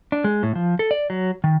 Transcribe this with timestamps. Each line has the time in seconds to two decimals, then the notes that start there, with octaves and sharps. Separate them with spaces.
0.12 D4
0.24 G#3
0.43 A2
0.55 F3
0.79 A4
0.91 D5
1.10 F#3
1.44 D#3